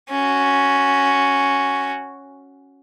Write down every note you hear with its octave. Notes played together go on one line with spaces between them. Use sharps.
C#4 F#4